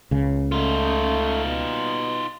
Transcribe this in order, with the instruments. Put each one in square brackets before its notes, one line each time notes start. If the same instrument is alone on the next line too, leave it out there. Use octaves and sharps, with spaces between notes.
[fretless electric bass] C#2 C#3
[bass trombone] A3 [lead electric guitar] D#4 F4
[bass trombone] B2